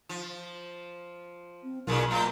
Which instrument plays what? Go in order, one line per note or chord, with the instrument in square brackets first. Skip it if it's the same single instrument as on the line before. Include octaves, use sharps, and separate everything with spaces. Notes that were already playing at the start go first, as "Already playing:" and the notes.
[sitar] F3
[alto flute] C4
[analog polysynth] B1 [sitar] A#2 C#3 F4 [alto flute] A#4
[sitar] B2 F4 [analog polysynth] A#3 G6 [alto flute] A#5